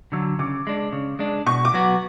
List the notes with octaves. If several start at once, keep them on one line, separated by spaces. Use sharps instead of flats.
D3 F#3 E6
C#3 D6
G#3 D4
C#3
G#3 D4
B2 C#6
D6
F#3 B3 F#4